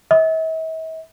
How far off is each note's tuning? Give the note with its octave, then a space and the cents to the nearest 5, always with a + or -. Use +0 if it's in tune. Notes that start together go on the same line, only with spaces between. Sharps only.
E5 -45